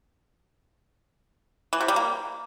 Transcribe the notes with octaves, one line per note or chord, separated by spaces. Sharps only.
E3
C3
G3
A#3